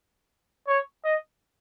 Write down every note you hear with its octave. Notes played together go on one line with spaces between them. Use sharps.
C#5
D#5